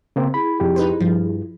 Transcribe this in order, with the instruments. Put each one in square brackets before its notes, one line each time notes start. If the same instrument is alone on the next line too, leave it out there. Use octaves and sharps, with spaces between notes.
[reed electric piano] C#3 A#3 C4
[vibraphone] E4 G#4 [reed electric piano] B5
[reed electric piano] F2 G4
[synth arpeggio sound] D#4 B4 C5
[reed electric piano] G2 [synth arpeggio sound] F3